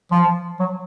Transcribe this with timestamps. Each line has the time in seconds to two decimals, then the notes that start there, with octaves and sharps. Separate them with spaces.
0.12 F3
0.60 F#3